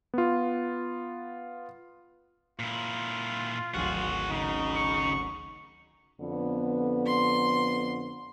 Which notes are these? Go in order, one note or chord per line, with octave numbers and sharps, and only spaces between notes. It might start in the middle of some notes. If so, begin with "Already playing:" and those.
B3 F4
A#2 E4 F4
D1 G#1 F#4 G#4
C#3 D#4
C#6
F2 D3 B3
C6